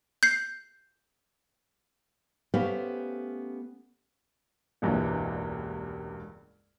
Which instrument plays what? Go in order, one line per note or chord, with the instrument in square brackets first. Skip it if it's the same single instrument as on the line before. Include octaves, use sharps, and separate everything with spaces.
[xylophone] G6 C7
[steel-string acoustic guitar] A3 B3 C#4 G4 C5 F5
[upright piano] E1 C#2 G2 A#2 E3